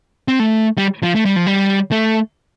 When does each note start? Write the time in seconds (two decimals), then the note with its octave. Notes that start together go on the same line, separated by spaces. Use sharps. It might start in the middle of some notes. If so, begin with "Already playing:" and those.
0.28 C4
0.40 A3
0.78 G3
1.03 F3
1.15 A3
1.25 G3
1.36 F3
1.47 G3
1.92 A3